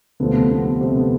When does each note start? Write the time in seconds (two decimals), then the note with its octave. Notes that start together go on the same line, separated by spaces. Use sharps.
0.20 D2 C3 F3 A3 B3
0.50 B3
0.81 C3 C4
0.96 B3